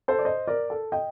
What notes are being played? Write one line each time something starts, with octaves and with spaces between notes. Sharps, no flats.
A4 C5
D5
C5 D#5
A#4 D5
A4
D#5 G5